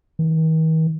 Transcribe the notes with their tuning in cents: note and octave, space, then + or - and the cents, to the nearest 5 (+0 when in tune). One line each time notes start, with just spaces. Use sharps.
D#3 +45